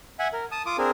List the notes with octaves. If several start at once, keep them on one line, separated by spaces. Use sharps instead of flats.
E5 F#5 G#5
A#4
A5 D#6
F4 D6 D#6
C4 D4 G#4 A#4